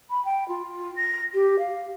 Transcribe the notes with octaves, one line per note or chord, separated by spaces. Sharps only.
B5
G5
F4
A#6
G4
F5